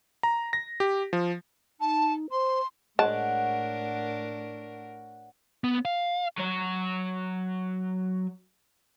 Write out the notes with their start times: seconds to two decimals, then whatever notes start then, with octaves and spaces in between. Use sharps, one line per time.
0.23 A#5
0.53 A#6
0.80 G4
1.13 F3
1.80 D#4 A5
2.31 C5 C6
2.99 A2 G#3 D4 A#4 C#5 F#5 A5
5.64 B3
5.85 F5
6.38 F#3 C#5